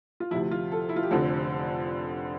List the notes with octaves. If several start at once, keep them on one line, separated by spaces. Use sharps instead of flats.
F4
D2 C3 F3 E4
F4
A4
E4
F4
G4
F1 F2 D3 A4